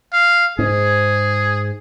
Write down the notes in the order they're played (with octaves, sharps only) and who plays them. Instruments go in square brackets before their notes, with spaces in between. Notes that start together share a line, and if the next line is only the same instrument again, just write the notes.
[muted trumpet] F5
[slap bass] G#2 [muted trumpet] G#4